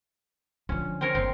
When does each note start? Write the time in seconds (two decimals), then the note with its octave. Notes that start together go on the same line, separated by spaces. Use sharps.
0.69 D3 F3 C#4
1.01 C4 A#4 C#5
1.15 F#1 C4